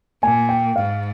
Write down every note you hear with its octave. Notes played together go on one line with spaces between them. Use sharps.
A#2 G#5
G5
G#2 F5